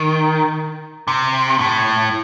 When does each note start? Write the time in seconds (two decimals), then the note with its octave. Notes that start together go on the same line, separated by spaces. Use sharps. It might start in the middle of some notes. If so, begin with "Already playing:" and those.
Already playing: D#3
1.08 C3
1.60 A2